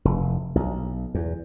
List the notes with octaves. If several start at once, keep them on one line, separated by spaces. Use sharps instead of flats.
F1
B1
E2